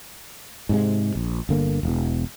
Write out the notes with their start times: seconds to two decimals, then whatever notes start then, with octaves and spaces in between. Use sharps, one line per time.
0.69 G#2 C3 G#3
1.16 A#1
1.49 G1 D3 A#3
1.83 E1 E2